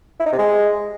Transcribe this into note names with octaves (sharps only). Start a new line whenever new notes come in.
E4
D#4
C3
G#3